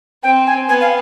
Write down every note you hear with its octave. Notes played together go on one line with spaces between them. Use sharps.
C4 G5
G#5
B3 G#5
F5